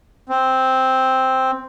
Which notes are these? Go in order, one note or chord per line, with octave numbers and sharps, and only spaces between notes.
C4